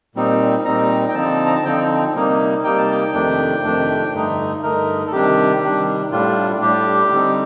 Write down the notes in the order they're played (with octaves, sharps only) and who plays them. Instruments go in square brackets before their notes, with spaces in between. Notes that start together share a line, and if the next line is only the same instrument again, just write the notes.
[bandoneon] A#2 G3 C4 D#4
A#2 G3 C4 D#4 A#5
G5
D3 F3 C4 D#4 A5
A#5
A5
D3 F3 C4 D#4 G5
C3 G3 A#3 D#4
C3 G3 A#3 D#4 G5
A5
G5
F2 C3 D#3 A3 D4
F2 C3 D#3 A3 D4
G2 D3 A3 D#4
G2 D3 A3 D#4 A#4
A4
C3 D#3 G3 D4 G4
C3 D#3 G3 D4
A2 G3 D4 F4
A2 G3 D4 G4
D3 G3 C4 D#4